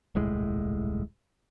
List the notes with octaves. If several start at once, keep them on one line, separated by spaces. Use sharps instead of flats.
D#1 C2 A2 G#3